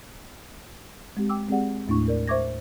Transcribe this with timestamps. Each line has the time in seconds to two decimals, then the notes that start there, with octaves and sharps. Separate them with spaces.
1.17 G#3 C4 G4
1.30 G5 D6 E6
1.49 G#3 C4 G4 G#4 D5 F#5
1.87 D#2 A2 A3 D4 E4 C#6
2.08 A#4 D5
2.28 C5 E5 C#6 D6 G#6 A#6